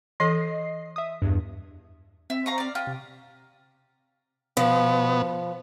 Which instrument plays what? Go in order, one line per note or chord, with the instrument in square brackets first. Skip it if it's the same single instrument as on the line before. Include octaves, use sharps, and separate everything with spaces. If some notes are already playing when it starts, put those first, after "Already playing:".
[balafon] E3 A4 [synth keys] D#5 C7
[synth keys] E5 D#6
E2 G2
[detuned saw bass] C4 [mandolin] E5
[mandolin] F5 A#5 C#6
D5 F5
F4 G4
[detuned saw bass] C3
[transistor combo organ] B2 B3 [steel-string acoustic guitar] F3